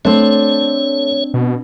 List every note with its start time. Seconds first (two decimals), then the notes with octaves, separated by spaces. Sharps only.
0.05 A3 C4 D4 C#5
1.34 B2